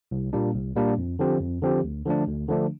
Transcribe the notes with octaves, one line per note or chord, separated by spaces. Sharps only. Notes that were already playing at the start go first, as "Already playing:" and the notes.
C2
A#2 G3 A#3 D4
C2
A#2 G3 A#3 D4
F2
D3 F3 C4 G4
F2
D3 F3 C4 G4
D2
D3 F3 A3 D4
D2
D3 F3 A3 D4